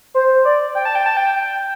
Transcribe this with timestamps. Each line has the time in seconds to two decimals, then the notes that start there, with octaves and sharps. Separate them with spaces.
0.14 C5
0.45 D5
0.75 G5
0.85 A5
0.95 G5
1.06 A5
1.17 G5
1.35 G5